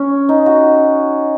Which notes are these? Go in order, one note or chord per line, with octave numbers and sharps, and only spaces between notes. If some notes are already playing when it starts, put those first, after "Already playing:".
Already playing: C#4
D#4
F#4